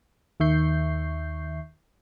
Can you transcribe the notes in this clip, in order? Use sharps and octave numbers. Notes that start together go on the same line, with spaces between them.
D#2 D#3 E5 C#6 G6 C7